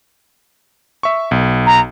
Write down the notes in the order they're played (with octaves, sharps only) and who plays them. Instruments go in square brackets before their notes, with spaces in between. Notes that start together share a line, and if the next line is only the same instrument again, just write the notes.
[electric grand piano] E5 C#6
B1
[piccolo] A#5